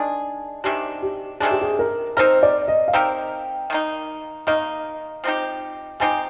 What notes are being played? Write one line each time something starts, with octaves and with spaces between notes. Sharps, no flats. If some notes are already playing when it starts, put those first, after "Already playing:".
Already playing: D#3 G#3 D4 G#4
C3 D#3 G#3 D4 G4
G4
C3 D#3 G#3 D4 G#4
G4
G#4
A#4
C4 D#4 G4 A#4 C5
D5
D#5
F5
C4 D#4 G4 A#4 G5
D#3 A#3 D#4
D#3 A#3 D#4 D#5
F3 C4 D#4 G4
F3 C4 D#4 G4 G#5